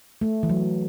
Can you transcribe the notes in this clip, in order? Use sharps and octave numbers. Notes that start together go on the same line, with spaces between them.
A3
E3
F#3